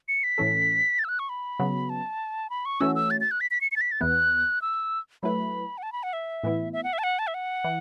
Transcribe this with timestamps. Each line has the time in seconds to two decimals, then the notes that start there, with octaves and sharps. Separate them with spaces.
0.08 C#7
0.24 B6
0.38 A2 E3 C#4 A4
0.99 A6
1.04 E6
1.09 F#6
1.19 C#6
1.29 B5
1.59 C#3 F#3 B3
1.90 A5
2.50 B5
2.65 C#6
2.81 E3 A3 C#4 F#4 E6
2.95 E6
3.11 A6
3.21 A6
3.31 F#6
3.41 B6
3.51 B6
3.61 C#7
3.72 C#7
3.76 A6
3.81 B6
3.92 A6
4.01 E2 E3 B3 F#6
4.62 E6
5.23 F#3 A3 E4 B4 B5
5.78 F#5
5.83 A5
5.92 B5
6.03 F#5
6.13 E5
6.44 A2 E3 B3 E4
6.73 E5
6.84 F#5
6.93 E5
6.99 A5
7.03 F#5
7.19 A5
7.27 E5
7.34 F#5
7.64 E3